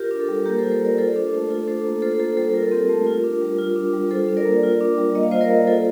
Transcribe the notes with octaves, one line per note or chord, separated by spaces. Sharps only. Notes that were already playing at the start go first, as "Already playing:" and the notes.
Already playing: F4 G4 A#4
D4
A4
G3
A#3 G4 A#4
A4 C5
F4
A4 C5
A#3 A#4 D5
F4 A4 C5
D4
A3
F4 A4
D4 A4 C5
A#3
F4 A4 C5
A#3 A4 C5
G3 A4 C5
F4 A#4
A4
C4 G4 A#4
A3
F4
D4
G3
F4
D4
G3
F4 A4 C5
D4
A#4 D5
A#3
F4
D4
G3
A#3 D#5
F5
F4 C5 D#5
A#4 D5
A#3
F4 A4 C5